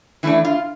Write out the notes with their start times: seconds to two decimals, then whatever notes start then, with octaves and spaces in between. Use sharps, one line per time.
0.23 E3 A3 D4 E4
0.45 F4